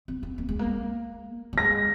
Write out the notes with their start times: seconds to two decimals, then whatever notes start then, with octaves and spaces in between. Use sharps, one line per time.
0.08 C4
0.23 C4
0.38 A#3
0.49 G#3
0.59 A#3
1.53 G3
1.58 G#3 A#6